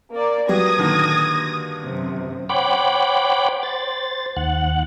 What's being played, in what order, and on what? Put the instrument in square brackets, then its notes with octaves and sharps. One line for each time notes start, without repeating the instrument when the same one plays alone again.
[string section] A#3 D5
[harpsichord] G2 [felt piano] F#3 [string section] D#6 G#6 A#6
[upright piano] A#2 D3 D#3
[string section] F#2 C3
[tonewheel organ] C5 C#5 F#5 G5 B5 D6
C5 A6
D#2 F#5